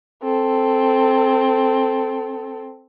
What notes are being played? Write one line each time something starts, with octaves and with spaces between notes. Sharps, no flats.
C4 A4